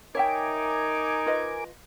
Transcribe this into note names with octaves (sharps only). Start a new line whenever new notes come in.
D#4 A#4 C#5 E5 G5 G#5 D6
F4 B4 D#5